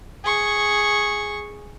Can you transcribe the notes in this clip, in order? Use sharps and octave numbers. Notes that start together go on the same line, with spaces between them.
G#4 C#6